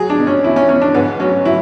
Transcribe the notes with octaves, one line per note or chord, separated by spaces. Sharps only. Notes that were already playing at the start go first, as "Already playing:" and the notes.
Already playing: F#3 G#4
D4
B2
C#4
E2 E4
C#4
E2 C#4
D4
G#2 B3
F#3 C#4
F#3 E4